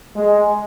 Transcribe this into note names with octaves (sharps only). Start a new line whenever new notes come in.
G#3